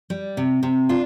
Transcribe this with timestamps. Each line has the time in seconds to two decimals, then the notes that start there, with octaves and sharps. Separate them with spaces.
0.10 G3
0.37 C3
0.63 C3
0.89 D4 F4